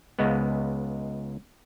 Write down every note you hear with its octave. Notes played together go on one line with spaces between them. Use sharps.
C#2 G#3 B3